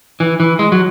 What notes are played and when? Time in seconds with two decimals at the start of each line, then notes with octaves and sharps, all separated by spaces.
0.20 E3
0.40 E3
0.59 G#3
0.72 F#3